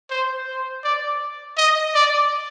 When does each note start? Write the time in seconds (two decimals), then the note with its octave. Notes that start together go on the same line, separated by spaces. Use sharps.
0.10 C5
0.47 C5
0.84 D5
1.57 D#5
1.95 D5